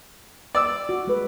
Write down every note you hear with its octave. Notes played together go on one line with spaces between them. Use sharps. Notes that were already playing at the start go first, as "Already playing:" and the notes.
D5 E6
F#4
G#3 B4